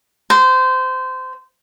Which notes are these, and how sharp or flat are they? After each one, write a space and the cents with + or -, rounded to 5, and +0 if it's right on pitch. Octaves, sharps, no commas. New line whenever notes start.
C5 -20